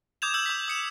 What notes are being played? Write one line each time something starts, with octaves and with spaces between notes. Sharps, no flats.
D6 D#6 G6 G#6 E7 F7
E6 G6 E7 F#7
D6 G6 B6
D#6 C#7 E7